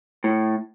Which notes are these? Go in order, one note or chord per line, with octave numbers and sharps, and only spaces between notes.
A2